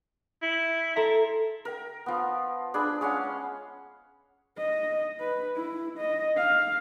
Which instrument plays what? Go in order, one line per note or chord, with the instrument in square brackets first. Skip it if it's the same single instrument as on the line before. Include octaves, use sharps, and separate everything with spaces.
[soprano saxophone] E4
[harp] A4 A#5 C6 [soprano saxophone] E5
[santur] A#4 G5
F3 B3
D4 G#4 D5 B5
G#3 C#4 F5 F#5
[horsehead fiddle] D#5
B4
E4
D#5
F5